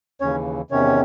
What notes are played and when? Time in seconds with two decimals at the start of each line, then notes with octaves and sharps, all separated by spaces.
0.21 D#2 C#3 E3 C#4 C#5
0.71 E2 C3 D#3 C#4 C#5